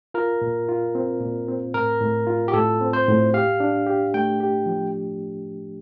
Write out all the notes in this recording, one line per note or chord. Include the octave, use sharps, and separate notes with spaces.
F4 A#4
A#2
F4
C4
A#2
C4
A2 A#4
A2
F4
G4
A2 A4
C4
C5
A2
G4 F5
D4
G4
A3 G5
G4
F3